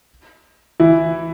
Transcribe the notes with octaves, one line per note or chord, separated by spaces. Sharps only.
E3 E4